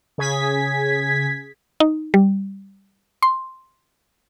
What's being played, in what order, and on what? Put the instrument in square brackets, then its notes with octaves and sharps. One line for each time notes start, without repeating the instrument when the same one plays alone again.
[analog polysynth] C#3 G#4 G#6 B6
[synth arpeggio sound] D#4
G3
C6